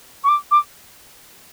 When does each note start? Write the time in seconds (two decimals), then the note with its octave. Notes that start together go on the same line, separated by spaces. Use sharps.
0.23 C#6
0.28 D6
0.51 D6